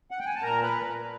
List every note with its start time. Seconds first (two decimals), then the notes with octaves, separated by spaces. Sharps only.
0.11 F#5
0.19 G5
0.26 G#5
0.35 A5
0.42 A#2 A#4 A#5
0.63 B4 B5
0.73 A#2